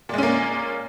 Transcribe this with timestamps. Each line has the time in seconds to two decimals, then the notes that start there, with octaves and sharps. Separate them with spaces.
0.09 A#2
0.14 G#3
0.18 C#4
0.23 A#3